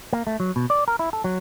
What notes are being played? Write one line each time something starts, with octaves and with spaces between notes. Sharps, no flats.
A#3
A3
F#3
B2
D5
A#4
E4
A4
F#3